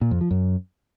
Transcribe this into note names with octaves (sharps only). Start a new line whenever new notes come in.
A#2
F2
F3
F#2